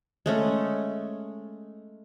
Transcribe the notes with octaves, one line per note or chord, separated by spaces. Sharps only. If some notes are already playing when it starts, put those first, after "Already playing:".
G#3 A3 C#4